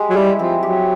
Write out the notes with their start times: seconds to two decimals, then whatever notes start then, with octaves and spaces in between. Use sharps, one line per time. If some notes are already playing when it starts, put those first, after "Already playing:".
Already playing: G#3 G4
0.10 F#3
0.16 G3 E4
0.39 F3 C4
0.62 F#3 G4